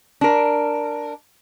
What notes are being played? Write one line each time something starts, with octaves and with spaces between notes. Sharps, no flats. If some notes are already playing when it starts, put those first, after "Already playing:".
D4 A#4